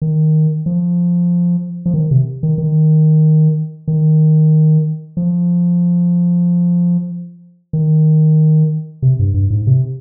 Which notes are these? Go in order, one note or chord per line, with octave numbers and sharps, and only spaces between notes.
D#3
F3
F3
D#3
C3
D#3
D#3
D#3
F3
D#3
C3
G2
G2
G#2
C3